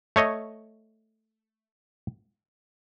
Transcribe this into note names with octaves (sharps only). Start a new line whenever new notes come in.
A3 C#5 D#5